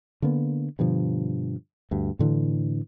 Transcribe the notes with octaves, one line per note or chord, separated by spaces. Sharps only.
D3 A#3 B3
G2 B2 D3 F3
D2 G2
A2 D3 E3 F#3